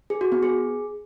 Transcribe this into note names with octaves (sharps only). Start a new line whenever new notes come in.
G#4
F#4
B3
G#4